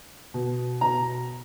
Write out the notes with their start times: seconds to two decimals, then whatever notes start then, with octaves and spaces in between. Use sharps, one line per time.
0.34 B2
0.81 B2 A#5